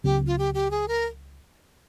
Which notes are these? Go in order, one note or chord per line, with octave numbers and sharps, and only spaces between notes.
C#2 C#3 F#3 B3 G4
F4
G4
G4
G#4
A#4